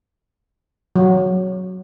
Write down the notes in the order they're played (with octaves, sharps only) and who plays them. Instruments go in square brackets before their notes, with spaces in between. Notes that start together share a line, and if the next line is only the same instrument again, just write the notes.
[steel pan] F#3